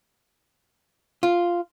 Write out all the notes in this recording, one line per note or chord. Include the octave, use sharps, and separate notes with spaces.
F4